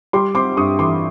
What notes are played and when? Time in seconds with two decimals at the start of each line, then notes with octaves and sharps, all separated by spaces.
0.13 G3 C6 D6
0.35 C4 C6 D6
0.57 G2 C#6 D#6
0.79 E3 C6 D6